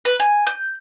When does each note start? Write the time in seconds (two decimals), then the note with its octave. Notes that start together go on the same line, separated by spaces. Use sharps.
0.05 B4
0.20 G#5
0.47 G6